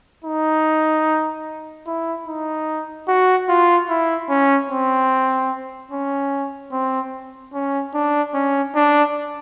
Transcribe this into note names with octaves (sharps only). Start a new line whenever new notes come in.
D#4
E4
D#4
F#4
F4
E4
C#4
C4
C#4
C4
C#4
D4
C#4
D4